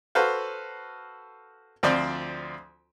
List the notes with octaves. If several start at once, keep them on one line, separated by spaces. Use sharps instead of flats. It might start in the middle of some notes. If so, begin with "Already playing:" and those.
F#4 A4 B4 C5 F5
D2 F3 C4 F4 C5 D5